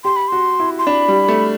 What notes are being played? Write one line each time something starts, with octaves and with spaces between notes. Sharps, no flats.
G4 C6
B5
F#4 C6
E4
C6
D4 B5
G3
A3